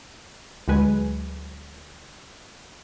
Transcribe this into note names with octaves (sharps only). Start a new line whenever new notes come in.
D2 F#3 G#3 B4 G#5